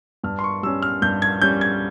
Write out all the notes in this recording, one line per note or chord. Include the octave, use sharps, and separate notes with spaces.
G2 F6
C6
C#6
G3 C#4 E6
F6
G2 G6
G#6
G3 C#4 G6
G#6